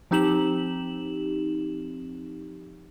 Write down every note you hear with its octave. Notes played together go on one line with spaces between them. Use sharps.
F3 C4 D#4 G4 E7 F#7